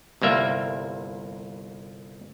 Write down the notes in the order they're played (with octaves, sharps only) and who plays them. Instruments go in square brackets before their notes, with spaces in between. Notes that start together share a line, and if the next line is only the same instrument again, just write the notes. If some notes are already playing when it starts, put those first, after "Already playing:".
[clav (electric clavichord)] G1 C2 A#3 E5